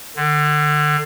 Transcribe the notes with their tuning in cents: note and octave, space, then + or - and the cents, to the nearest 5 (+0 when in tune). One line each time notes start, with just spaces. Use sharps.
D3 +30